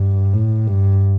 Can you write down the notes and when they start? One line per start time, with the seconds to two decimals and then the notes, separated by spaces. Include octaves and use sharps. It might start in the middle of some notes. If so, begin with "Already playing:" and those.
Already playing: G2
0.33 A2
0.67 G2